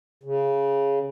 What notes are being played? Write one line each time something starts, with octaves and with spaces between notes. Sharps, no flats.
C#3